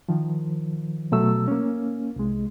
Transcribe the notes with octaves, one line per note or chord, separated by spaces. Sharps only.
D#3 F3
B2 F#3 A3 E6
A#3 C#4
C2 G#3